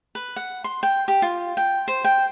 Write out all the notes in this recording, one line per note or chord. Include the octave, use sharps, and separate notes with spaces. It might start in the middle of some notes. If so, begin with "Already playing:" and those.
B4
F#5
C6
G5
G4
F4
G5
C5
G5